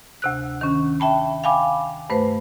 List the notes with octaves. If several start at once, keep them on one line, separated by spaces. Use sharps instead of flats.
D2 C3 F#6
D#3 C#4
E5 G5 A5 B5
F5 G5 G#5 B5 D6
G2 A3 B4 C5